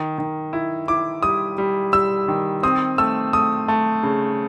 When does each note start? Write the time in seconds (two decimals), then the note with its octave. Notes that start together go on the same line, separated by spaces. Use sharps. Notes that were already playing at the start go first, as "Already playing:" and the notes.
Already playing: D#3
0.18 D#3
0.53 E4
0.88 E4 D6
1.23 G3 D#6
1.58 G3
1.93 G3 E6
2.28 D#3
2.63 C4 D#6
2.98 A3 E6
3.33 A3 D#6
3.68 A3
4.03 C#3